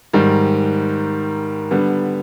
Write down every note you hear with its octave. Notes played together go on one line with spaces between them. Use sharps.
G#2 D#3 G3
D3 G3 B3